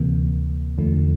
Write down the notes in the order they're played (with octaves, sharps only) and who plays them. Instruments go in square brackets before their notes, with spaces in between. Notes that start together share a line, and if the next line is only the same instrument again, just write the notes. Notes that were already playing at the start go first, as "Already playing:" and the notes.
Already playing: [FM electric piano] D2 C3 E3 A#3
E2 D3 F3 A3